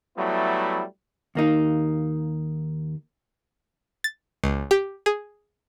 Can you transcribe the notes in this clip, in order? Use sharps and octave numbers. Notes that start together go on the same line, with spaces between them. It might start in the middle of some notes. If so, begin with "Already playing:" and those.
F#3 G3 A3 B3 E4
D#2 A#3 D#4
A6
C#2
G4
G#4